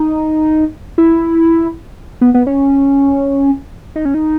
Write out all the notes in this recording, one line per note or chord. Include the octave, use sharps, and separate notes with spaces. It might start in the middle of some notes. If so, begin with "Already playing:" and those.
Already playing: D#4
E4
B3
B3
C#4
D#4
C#4
D#4